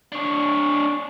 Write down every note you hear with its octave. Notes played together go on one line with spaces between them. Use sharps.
D4 C#5